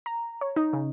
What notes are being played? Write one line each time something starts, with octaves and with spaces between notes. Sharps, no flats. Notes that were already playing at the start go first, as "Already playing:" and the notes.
A#5
C#5
D#4
C#3